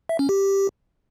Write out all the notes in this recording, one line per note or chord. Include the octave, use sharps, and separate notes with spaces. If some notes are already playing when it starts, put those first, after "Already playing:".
E5
C#4
G4